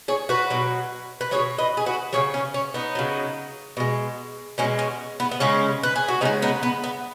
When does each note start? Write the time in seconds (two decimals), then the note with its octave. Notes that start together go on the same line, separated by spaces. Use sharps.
0.08 G#4 C#5
0.29 F#4 B4
0.50 B2 F#3
1.21 B4
1.31 B2 F#3 G#4 C#5
1.58 B4 D#5
1.77 G#4
1.86 F#4 B4
2.13 C#3 F#3 G#4 C#5
2.34 C#4
2.54 C#4
2.74 B3 D#4
2.95 C#3 F#3
3.77 B2 G#3
4.58 B2 G#3 C#4
4.79 C#4
5.20 B3
5.31 B3
5.40 C#3 G#3 C#4
5.83 B4
5.96 G#4
6.08 F#4
6.21 C#3 G#3 B3 D#4
6.42 B3 D#4
6.63 B3
6.84 B3